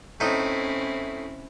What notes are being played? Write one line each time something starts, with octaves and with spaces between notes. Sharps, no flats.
A2 C4 C#4 D#4 E4